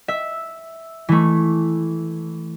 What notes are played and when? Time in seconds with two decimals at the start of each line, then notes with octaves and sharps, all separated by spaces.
0.08 E5
1.09 E3 A3